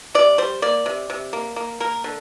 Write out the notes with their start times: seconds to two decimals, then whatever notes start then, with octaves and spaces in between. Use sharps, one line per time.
0.15 C3 D5
0.38 G3 C5
0.62 A#3 D5
0.86 C3
1.10 C3
1.33 A#3
1.56 A#3
1.80 A#3 A#4
2.04 D3